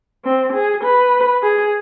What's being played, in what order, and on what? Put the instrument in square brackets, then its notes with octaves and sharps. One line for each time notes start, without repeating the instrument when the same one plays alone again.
[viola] C4
G#4
B4
G#4